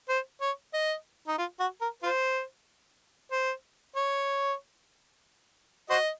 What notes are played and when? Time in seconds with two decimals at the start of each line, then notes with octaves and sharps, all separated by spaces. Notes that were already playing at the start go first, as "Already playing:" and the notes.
0.09 C5
0.41 C#5
0.74 D#5
1.28 D#4
1.38 F4
1.60 F#4
1.81 A#4
2.03 F4 C5
3.32 C5
3.96 C#5
5.90 F#4 C5 D#5